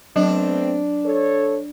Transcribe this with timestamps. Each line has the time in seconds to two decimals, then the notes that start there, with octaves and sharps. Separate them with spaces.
0.16 F#3 A3 B3 C4 D4
1.05 A4 C#5